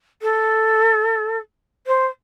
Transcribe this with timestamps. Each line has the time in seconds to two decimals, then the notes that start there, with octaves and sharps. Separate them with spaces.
0.22 A4
1.86 C5